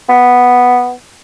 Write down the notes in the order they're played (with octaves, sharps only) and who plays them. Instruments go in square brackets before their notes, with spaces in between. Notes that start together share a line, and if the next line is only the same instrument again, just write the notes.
[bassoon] B3